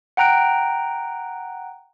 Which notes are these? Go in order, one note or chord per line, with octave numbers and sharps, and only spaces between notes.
F#5 G5 A#5 F#6 D7